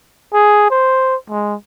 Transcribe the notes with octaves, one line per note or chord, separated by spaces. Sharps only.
G#4
C5
G#3